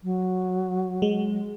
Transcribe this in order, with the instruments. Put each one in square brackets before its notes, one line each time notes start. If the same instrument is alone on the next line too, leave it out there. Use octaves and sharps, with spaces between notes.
[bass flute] F#3
[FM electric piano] G#3